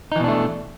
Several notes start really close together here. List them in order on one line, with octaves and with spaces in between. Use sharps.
D#4 E3 B2 D4 A3